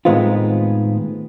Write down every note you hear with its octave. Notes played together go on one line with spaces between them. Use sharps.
A2 D#3 G#3 B3 C4 F4